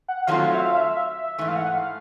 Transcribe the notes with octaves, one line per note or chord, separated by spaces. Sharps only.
F#5
D#3 F#3 A3 C4 F4 F5
E5
F5
E5
G#2 E3 A3 E5
F5
F#5
F5